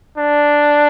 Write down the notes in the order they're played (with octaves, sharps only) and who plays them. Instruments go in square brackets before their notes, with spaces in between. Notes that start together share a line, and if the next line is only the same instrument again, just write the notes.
[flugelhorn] D4